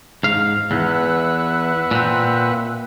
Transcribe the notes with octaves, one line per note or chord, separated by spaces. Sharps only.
G#2 F5
E2 B4 E5 F#5
A#2 C4